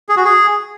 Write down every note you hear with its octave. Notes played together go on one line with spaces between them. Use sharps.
G#4
F#4
G#4